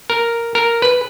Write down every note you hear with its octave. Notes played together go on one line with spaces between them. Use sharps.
A#4
A#4
B4